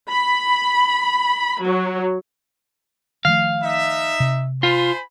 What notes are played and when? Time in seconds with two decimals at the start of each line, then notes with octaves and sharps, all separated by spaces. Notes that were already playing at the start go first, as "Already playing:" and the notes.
0.10 B5
1.63 F#3
3.25 D#3 F3 A3 F5
3.63 D#4 E5
4.20 C3
4.63 F4 C5 G#5 B5